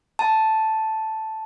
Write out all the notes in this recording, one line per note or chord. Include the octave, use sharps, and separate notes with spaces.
A5